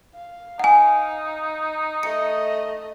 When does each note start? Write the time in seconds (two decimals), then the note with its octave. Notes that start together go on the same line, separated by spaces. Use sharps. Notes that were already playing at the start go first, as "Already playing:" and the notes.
0.15 F5
0.59 D#4 F#5 G#5
2.03 A3 D#5 C#7